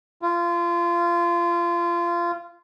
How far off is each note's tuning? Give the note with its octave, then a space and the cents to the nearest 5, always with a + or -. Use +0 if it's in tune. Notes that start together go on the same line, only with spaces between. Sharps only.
F4 -25